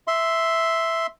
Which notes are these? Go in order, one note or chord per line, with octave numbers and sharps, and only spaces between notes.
E5 C6